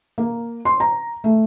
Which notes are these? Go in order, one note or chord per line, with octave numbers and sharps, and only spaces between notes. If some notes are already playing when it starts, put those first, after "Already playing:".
A#3
C6
A#5
A3